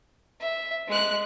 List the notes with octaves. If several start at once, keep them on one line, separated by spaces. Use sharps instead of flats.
E5
G#3 F#6